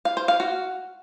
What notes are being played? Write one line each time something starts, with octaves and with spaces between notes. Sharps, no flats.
F5
C5
F5
F#4